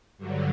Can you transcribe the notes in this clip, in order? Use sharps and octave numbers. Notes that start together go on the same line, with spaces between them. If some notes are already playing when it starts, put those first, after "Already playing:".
G2 D3 F#3